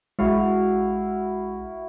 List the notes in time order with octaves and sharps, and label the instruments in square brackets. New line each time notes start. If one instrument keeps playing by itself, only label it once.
[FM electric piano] A#1 G#3 [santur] E4 F#4 F5